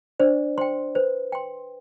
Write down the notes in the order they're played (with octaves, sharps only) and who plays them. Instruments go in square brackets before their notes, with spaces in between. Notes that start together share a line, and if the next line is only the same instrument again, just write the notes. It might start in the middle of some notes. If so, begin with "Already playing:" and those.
[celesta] D4 D5 [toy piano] C5
[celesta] C5 [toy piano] G5 C6
[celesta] B4 [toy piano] C5
[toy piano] G5 C6